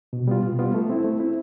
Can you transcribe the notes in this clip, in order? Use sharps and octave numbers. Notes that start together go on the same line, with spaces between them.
B2
G3 B3 F4
B2
G3 B3 F4
A3
C4 E4
A3
C4 E4